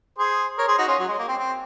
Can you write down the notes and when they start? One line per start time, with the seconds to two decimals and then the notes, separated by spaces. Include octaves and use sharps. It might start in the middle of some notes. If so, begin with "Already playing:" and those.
0.18 G#4 C5
0.58 A#4 C#5
0.68 G#4 C5
0.78 D#4 F#4
0.88 C#4 F4
0.98 F#3
1.08 G#3
1.18 A#3
1.28 C4
1.38 C4